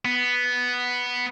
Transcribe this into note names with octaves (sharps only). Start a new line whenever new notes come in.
B3